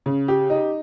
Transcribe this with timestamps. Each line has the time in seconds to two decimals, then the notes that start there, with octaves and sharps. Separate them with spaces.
0.06 C#3
0.28 G4
0.50 D#4